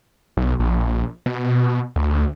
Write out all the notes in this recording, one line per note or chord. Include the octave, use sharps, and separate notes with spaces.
B1
A#1
B2
D2